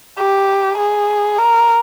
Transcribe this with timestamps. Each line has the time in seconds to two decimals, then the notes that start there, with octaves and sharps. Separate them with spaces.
0.18 G4
0.78 G#4
1.38 A#4